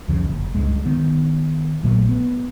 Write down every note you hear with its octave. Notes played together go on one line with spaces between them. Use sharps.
C2 F2 C#3 F3
F#1
C#2 G2 G#3
D#3 B3
A#1 A#2 F#3 A3
B3